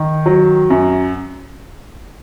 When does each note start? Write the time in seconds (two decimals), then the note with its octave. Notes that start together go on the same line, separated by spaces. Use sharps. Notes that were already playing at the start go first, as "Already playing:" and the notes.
Already playing: D#3
0.26 F#3
0.70 F#2